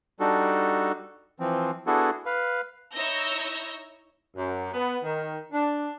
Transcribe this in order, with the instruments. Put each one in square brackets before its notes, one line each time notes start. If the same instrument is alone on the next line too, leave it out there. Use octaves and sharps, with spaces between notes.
[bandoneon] G3 D4 D#4 F#4 A4
E3 F3 C4
B3 D4 E4 F#4 G#4 A4
B4 F5
[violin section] D#4 E4 C#5 E6 G6 A#6
[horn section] F#2
B3
D#3
D4